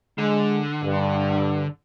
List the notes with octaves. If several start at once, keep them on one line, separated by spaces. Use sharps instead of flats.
D3 G#3
G2